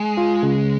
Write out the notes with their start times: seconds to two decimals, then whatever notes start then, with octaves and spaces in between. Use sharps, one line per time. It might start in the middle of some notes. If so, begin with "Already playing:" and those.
Already playing: G#3
0.17 F4
0.43 C#3